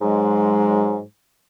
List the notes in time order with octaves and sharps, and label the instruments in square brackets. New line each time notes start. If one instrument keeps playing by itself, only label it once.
[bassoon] G#2 [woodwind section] F#3 G#3